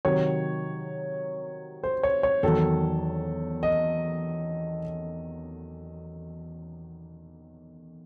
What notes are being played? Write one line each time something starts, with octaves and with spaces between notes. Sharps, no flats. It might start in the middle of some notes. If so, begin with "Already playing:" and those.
C3 D#3 F#3 C#5
C5
C#5
C#5
E2 D#3 F#3 A4
D#5